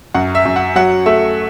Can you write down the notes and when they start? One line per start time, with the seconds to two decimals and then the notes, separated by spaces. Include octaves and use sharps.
0.14 F#2 F#5
0.35 E5
0.45 F#2
0.56 F#5
0.76 F#3 F#5
1.06 A3 E5